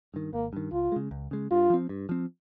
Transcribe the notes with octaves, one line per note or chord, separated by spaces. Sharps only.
G2 D#3
G#1 A#3
G2 D#3
C#2 F4
C#3 G#3
C#2
C#3 G#3
G2 F4
F3 C4
G2
F3 C4